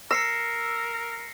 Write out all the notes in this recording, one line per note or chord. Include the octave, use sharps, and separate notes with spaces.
A#4 E6 A#6 C7 C#7